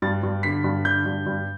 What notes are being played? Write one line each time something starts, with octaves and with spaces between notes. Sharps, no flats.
G2 A6
G2
D3 B6
G2
D3 G6
G2
G2